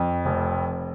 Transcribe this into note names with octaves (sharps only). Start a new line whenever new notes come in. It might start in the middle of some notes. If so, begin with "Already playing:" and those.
Already playing: F2
F1